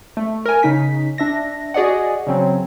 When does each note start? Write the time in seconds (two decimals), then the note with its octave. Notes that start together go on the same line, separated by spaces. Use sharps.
0.17 A3
0.46 A#4 G#5
0.63 C#3 D#4 B6
1.18 D4 E5 A#6
1.74 F#4 G#4 D5 D#5 F#5
2.27 C#3 F#3 C4